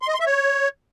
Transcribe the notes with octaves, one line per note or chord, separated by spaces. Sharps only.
C6
D#5
C6
E5
C#5